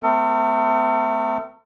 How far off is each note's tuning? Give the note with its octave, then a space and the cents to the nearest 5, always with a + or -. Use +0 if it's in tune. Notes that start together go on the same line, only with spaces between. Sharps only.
A3 +0 C4 -45 A4 +45